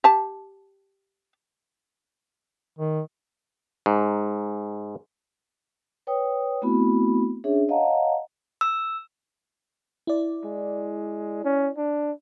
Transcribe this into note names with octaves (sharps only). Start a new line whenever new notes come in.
G4 A5
D#3
G#2
B4 C#5 G5 D#6
A3 B3 C4 E4 F#4 B5
C#4 D4 G#4 C#5 E5
C#5 D#5 F5 F#5 A5 A#5
E6
E4 D5
G#3
C#4
D4